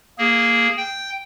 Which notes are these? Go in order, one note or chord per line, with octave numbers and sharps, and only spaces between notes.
A#3 G#4
G5